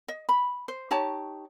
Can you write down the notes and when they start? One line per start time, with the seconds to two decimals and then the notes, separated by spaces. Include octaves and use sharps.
0.08 D#5
0.29 B5
0.68 C5
0.91 D#4 G4 C#5 A5